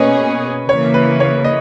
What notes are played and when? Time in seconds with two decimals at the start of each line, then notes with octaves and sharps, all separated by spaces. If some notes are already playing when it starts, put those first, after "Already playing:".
Already playing: B2 A#3 C#4 G#4 B4 C#5 D#5
0.68 C#3 E3 A#3 C#5
0.94 B4
1.20 C#5
1.45 D#5